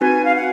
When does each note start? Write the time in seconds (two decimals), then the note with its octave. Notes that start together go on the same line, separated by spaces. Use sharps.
0.01 C4 D#4 F#4 B4 G#5
0.23 F5
0.34 F#5